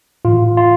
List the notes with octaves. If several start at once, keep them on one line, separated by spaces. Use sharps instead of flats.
A2 E3 F4
F4